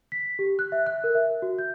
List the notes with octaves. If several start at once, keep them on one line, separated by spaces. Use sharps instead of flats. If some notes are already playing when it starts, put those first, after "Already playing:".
B6
G4
F#6
E5
F#6
A#4
E5
F#4
G6